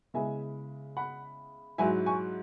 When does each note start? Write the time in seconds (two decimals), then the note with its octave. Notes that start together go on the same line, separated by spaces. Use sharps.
0.14 C#3 G#3 B3 E4 E5 G#5
0.97 F#5 B5
1.78 G#2 F#3 E4 E5 G#5
2.06 G#5 C#6